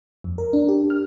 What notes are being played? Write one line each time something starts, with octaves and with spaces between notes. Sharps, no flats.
F2
A#4
D4
G4
F6